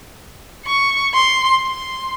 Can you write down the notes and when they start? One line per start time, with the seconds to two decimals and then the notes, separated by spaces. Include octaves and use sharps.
0.66 C#6
1.14 C6
1.62 C6